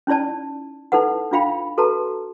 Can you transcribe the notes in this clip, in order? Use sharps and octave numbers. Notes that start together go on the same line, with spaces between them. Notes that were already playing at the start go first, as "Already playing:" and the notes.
C#4 D#4 E4 D5 A5
D#4 E4 A4 B4 F#5
D4 E4 F4 F5 G5 B5
F#4 A4 B4 A5 A#5